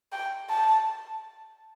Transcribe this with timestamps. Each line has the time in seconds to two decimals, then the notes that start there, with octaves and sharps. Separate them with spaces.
0.12 G5
0.50 A5